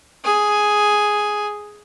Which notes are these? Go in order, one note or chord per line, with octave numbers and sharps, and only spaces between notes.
G#4 G#5